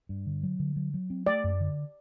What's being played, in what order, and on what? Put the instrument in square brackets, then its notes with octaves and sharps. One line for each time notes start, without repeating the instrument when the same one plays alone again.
[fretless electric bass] G2
D3
F#3
D3
F#3
F#3
C4
[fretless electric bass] A3 [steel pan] D5
[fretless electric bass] F#2
D3